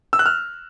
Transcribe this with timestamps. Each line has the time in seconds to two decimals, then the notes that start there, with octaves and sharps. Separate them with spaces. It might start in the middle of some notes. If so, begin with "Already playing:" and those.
0.13 E6
0.19 F#6
0.26 F6